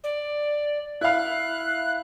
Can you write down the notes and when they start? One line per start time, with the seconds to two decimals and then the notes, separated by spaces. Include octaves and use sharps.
0.04 D5
1.01 E4 F5 F#6